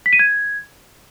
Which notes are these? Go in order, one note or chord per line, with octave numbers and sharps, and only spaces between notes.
B6
D#7
G#6